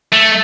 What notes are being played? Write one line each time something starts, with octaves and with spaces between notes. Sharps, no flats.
A3